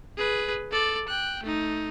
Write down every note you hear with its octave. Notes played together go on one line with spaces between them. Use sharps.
G#4 B4
A4 D5
G5 F#6
A3 D#4